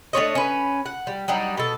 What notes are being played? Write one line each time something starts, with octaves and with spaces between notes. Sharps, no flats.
A3 D4 C#5 D#5
C#4 B4
F#5
G3
F#3 G3 D4 D#4
B2 A4